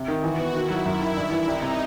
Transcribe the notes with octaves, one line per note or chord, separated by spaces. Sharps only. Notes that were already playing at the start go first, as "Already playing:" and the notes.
Already playing: C3
D#3
E3 F#4
B3
D#3 E4
F#3
F#2 E4
D#3
G2
E3
C2 D#4
C3